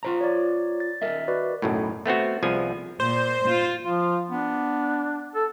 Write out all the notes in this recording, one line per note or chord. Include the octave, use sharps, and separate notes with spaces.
F4 C5 A#5
C#5 D5
A6
A#4 D#5 E5
F#4 B4 D5
B1 F#2 A2
A3 B3 C4 F#4
C2 F3 B3 G#4 G#5
A#2 C5
F4
F3 F4
B3 D4
A4